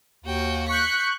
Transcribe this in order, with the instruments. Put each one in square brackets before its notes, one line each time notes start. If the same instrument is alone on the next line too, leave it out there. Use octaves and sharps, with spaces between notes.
[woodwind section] D#2 [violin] F#4 G5
[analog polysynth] C#6 F#6 G6 [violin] B6 C#7